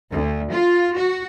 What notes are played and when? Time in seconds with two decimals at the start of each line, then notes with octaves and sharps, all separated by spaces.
0.12 D2
0.52 F4
0.96 F#4